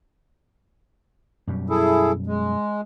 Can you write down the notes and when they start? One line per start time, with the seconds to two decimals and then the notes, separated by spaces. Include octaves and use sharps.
1.47 F#2 B2 G3
1.70 E4 G#4 A4
2.26 G#3